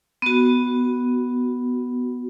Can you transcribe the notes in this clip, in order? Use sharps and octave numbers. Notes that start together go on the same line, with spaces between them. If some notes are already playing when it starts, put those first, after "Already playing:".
B3 F#4